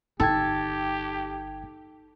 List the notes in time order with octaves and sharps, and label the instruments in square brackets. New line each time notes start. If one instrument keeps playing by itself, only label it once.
[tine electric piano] G1 G5 G#6 [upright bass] D#4 [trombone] G4 [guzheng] A4